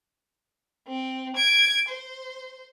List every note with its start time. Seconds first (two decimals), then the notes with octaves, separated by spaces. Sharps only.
0.87 C4
1.36 G#6 D7
1.89 C5